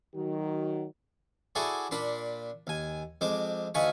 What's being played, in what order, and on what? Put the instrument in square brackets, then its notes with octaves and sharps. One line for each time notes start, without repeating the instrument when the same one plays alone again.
[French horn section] D#3 F#3 F#4
[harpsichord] E4 F#4 G#4 A4 D5 C6
A#2 D4 B5 C6
D#2 G#5
F2 G#3 C5 D6
D2 D#4 F4 G#5 B5 C#6